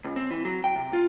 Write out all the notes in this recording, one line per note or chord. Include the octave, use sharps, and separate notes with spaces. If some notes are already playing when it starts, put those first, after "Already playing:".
C#2
C4
E3
F#3
G5
C3
F4